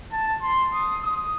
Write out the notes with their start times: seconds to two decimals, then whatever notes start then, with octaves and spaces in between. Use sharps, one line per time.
0.12 A5
0.42 C6
0.74 D#6
1.04 D#6